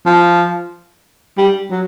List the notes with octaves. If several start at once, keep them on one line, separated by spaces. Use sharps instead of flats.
F3
G3
F#3